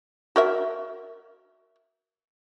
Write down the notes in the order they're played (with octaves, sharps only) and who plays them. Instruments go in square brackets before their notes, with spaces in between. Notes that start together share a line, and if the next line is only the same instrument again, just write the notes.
[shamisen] F#4 A#4 E5